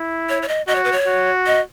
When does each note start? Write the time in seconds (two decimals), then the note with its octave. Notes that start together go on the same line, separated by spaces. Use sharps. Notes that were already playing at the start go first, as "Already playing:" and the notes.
Already playing: E4
0.29 C#5
0.42 C#5
0.48 D#5
0.68 F#4 D#5
0.75 C#5
0.84 B4
0.92 C#5
1.07 F#4
1.46 D#5